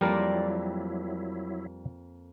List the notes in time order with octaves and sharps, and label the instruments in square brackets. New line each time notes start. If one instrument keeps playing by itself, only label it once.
[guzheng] F2 A#3 D5 [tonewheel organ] F#3 E4 [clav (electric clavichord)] G3 A#4